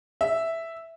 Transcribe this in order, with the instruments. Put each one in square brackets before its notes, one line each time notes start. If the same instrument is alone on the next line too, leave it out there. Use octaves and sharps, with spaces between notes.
[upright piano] E5